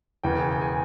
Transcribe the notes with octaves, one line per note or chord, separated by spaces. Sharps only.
E1 E2 C#3 G5
G5
G#5